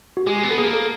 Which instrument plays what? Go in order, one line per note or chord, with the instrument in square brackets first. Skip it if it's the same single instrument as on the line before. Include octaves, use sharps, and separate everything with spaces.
[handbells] F#4
[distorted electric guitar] G#3 [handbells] G4
[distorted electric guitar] B3
[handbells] A4
[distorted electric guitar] A#3 [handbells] G#4
[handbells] A4